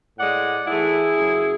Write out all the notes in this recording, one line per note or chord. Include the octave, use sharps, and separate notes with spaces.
A2 G#3 D5 F#5
G#2 E3 A3 E4 G#4
F#2 C#3 F#3